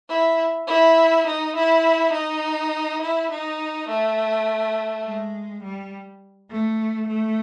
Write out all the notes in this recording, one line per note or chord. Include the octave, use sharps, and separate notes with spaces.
E4
E4
D#4
E4
D#4
E4
D#4
A3
G#3
G3
A3
A3